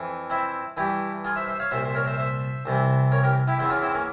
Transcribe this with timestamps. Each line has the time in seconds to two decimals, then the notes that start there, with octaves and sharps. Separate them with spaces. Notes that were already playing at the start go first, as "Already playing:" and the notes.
Already playing: F2 E3
0.30 C4 E4
0.77 G2 E3 E4 G4
1.25 F4 G#4
1.36 C5 E5
1.47 C5 E5
1.60 C#5 F5
1.71 C2 A#2 C5 E5
1.83 C5 E5
1.95 A#4 C#5
2.06 C5 E5
2.18 C5 E5
2.65 C2 C3 E3
3.12 A#4 C#5
3.24 G4 A#4
3.47 E4 G4
3.59 E2 E3 C4 E4
3.70 C#4 F4
3.82 C4 E4
3.94 A#3 C#4